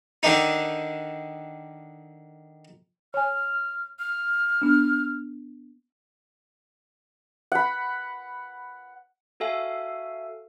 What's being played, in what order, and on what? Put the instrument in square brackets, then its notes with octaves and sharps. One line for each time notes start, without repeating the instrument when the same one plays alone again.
[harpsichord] D3 D#3 D4 D#4
[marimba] C#5 G#5 [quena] F6
[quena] F6
[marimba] B3 D4
[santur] F#5 B5
[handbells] F#4 A4 E5 F5 G#5